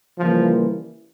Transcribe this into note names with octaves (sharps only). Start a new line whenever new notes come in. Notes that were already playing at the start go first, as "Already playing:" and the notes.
C#3 E3 F3 G3 A#3